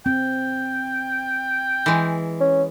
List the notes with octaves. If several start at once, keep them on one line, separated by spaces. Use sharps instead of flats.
C4 G5
E3 G#3
C#4